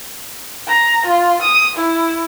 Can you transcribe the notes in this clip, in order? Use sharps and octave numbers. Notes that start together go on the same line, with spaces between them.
A#5
F4
D#6
E4